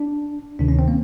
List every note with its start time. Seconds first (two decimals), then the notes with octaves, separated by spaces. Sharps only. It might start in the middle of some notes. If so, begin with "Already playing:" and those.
Already playing: D4
0.59 D2 C3 D#3 D4
0.68 C#4
0.79 C4
0.88 A#3